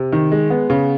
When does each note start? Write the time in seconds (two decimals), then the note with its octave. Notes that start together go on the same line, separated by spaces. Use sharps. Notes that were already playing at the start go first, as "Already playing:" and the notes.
Already playing: C3
0.12 D#3
0.31 G#3
0.50 B3
0.70 C#3